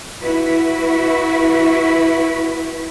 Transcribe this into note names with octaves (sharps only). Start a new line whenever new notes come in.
E4 F#4 B4